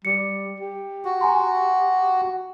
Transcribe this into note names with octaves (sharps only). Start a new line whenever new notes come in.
G3 C#7
G4
F#4
G#5 A#5 C6